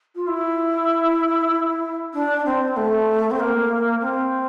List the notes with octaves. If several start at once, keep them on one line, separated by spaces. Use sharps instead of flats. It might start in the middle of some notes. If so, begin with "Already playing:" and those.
F4
E4
D4
C4
A3
C4
A#3
C4